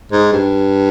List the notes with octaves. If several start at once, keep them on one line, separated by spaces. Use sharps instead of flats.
G#2
G2